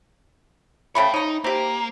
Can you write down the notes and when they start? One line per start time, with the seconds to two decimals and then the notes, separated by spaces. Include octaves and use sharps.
0.95 C#3 A3 C#5 G5 B5
1.14 D#4 C#5 A#5
1.44 A#3 C4 G4